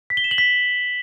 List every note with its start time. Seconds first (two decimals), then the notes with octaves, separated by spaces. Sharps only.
0.10 B6
0.17 G7
0.24 E7
0.31 F#7
0.38 B6